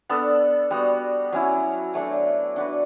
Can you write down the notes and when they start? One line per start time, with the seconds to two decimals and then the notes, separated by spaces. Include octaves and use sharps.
0.09 B3 D4 A4
0.71 G3 B3 F#4
1.32 F#3 C#4 E4
1.94 F#3 A3 D4 A4
2.56 D4 F#4 B4